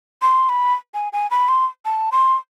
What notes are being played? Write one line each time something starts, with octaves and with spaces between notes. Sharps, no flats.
C6
B5
G#5
G#5
B5
C6
A5
C6